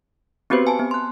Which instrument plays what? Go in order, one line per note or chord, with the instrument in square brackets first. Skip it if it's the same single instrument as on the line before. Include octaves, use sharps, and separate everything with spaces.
[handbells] B3 C4 F#4 G4 B4 C5
G#5 A5
B3
C6 F#6